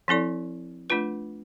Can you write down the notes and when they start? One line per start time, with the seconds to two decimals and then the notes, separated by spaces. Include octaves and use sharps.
0.08 F3 C4 E4 A4 D5
0.90 A3 D4 F4 B4